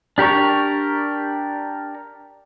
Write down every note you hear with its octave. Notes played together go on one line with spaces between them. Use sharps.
D4 G4 A#4 A#5 C#6